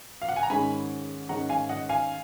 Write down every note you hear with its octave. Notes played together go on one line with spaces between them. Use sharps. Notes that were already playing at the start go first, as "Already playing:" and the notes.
F5
F#5
G#5
A#5
G#2 D#3 G#3 C#4 G#5 B5
G#2 D#3 G#3 C#4 F#5 A#5
F5 G#5
D#5 F#5
F5 G#5